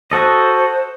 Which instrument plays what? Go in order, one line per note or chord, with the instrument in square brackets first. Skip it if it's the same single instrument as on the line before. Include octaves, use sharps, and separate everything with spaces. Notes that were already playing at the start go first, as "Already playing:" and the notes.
[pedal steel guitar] F#4 A4 D#5 [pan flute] C5